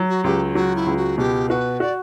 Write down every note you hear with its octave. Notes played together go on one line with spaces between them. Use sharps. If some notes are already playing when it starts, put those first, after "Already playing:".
Already playing: F#3
F#4
C#2 G4
F#3 F#4
E4
C#2
F#4
B2 G4
F#4 B4
F#4 D5